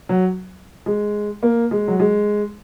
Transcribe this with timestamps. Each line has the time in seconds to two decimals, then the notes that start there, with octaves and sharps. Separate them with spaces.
0.09 F#3
0.86 G#3
1.43 A#3
1.71 G#3
1.88 F#3
1.99 G#3